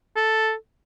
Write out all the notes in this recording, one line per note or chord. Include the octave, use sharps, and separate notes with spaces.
A4